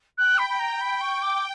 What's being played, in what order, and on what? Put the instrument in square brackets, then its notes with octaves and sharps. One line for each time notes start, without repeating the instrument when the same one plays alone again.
[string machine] G5 [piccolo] F#6
[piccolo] B5
B5
A#5
B5
C#6
D6